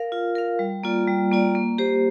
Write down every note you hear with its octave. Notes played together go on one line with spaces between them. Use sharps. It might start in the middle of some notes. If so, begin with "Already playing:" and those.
Already playing: A#4 F5
F4
A#4 F5
G3
A#3 F4 D5
G3
A#3 F4 D5
A#3
G4 C5